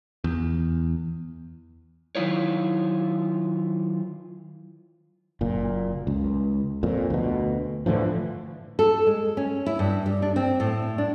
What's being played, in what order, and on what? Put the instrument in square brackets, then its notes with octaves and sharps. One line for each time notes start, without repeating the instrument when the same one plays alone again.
[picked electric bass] E2
[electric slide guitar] D#3 F#3 E4 F4 C#5
[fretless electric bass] F#1 A#2
C#2
F2 A#2
D2 B2
A2 D3 E3 F3
[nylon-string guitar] A4
G#3
C#4
E4
G2
G3
D4
C4
A2
D4